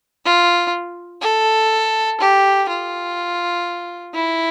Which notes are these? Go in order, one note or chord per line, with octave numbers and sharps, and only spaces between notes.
F4
A4
G4
F4
E4